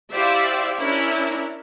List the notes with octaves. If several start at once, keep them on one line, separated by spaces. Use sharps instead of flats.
E4 G4 C5 D5 E5 F5
C#4 D4 E4 A#4